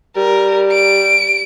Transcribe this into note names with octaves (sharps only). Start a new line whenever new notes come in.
G3 A#4
D7